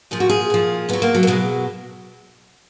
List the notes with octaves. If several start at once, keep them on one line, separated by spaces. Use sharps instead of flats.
A#2 F3 G#4
F#4
G#4
A#2 F3
B2 F#3 B3
A#3
F#3
A#3
B2 F#3 G#3